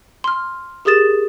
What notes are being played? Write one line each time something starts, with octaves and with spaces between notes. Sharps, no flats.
C6 F6
G4 G#4 A#4 D#6 A6 E7